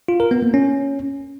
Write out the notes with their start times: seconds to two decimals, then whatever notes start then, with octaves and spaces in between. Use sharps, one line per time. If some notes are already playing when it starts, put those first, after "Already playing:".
0.08 F4
0.20 A#4
0.31 B3
0.42 A#3
0.54 C#4